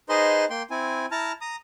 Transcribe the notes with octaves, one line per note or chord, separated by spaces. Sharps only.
D#4 G#4 B4 C5 D#5 C6
A#3 G5 C6
C4 E4 G#5
E4 A5 A#5 F6
A#5 D#6